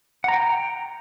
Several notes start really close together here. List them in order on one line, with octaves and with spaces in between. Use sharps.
F#5 A#5 G5